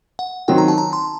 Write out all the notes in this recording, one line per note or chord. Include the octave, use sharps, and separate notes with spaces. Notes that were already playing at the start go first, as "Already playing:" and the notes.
F#5
D#3 F#3 C4 F#4 G5
A#5
A5
A#5
C6